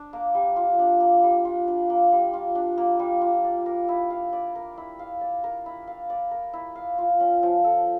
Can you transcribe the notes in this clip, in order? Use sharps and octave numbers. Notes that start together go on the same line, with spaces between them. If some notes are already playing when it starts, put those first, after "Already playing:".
Already playing: D4
A#3
G3
F4
D4
A#3
G3
F4
D4
A#3
G3
F4
D4
A#3
G3
F4
D5
A#4
E4
F5
D5
A#4
E4
F5
D5
A#4
E4
F5
D5
A#4
E4
F5
F4
C#4
F3
A4